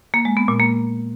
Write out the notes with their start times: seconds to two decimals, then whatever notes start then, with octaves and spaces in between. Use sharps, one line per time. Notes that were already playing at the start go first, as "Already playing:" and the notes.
0.14 A#3
0.25 G#3
0.37 B3
0.48 A#2
0.60 A#3